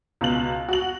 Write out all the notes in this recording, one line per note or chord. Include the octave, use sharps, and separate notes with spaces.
C#2 B2 F#7
F#4 F#7